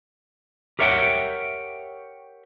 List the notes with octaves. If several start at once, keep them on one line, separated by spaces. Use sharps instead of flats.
G4 A#4 C#5 E5 F#5 G5